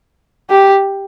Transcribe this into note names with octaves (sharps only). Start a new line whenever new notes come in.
G4